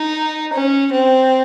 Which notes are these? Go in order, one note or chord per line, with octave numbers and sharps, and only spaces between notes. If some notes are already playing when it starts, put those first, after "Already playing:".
Already playing: D#4
C#4
C4